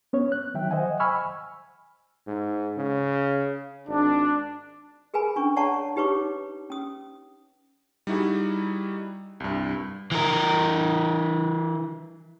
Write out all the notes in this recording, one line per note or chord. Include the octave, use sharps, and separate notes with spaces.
B3 C#4 C#5
F#6
D#3 F#3 E5 G5
C5 D#5 F#5 G#5
G#5 B5 C#6 E6 F6
G#2
C#3
G#1 D4
G#4 A#4 B4 G#5 B5
C#4 D4 C#6
C#5 D5 F#5 A5 A#5 C#6
D#4 G4 B4 C#5 C#6 D6
C#4 D#6
G3 D#4 E4 F#4 G#4
C2 G2
E3 A#4